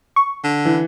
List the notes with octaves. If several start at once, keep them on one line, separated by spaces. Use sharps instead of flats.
C#6
D3
E3